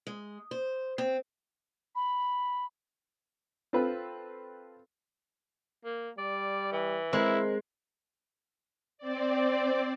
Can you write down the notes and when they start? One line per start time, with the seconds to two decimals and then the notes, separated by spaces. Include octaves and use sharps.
0.07 G#3
0.51 C5
0.98 C4
1.95 B5
3.73 C4 F4 A4 B4
5.85 A#3
6.18 G3 D5
6.72 E3
7.13 G#3 C4 E4 A#4 C5
8.98 C4 D5